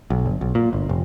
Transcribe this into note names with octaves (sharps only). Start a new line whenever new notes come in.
B1
G1
B1
A#2
G1
F1